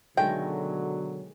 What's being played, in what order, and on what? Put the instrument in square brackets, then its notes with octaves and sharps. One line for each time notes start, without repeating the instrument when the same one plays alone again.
[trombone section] B2 D3 F#3 [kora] D#3 G#3 A3 [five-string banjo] G5